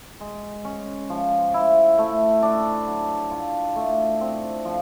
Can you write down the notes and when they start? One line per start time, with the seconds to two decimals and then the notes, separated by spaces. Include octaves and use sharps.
0.21 G#3
0.65 C#4
1.10 F3
1.54 E4
1.98 A3
2.42 D4
2.87 F#3
3.31 F4
3.76 A3
4.21 C4
4.65 F3